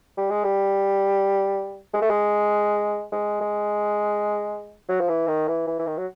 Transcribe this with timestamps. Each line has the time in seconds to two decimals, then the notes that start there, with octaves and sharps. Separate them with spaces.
0.18 G3
0.30 G#3
0.44 G3
1.94 G#3
2.02 A3
2.10 G#3
3.12 G#3
3.41 G#3
4.89 F#3
5.01 F3
5.09 E3
5.28 D#3
5.48 E3
5.67 E3
5.80 E3
5.87 D#3
5.98 F#3